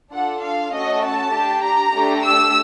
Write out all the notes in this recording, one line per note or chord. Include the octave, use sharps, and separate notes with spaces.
D4 F4 A4 F#5
F5
A3 C#4 F#4 A4 D#5
A5
D4 G4
A#5
A3 D4 G4
E6